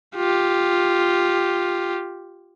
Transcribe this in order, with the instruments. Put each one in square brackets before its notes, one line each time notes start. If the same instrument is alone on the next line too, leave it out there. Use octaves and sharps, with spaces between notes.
[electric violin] F4 G4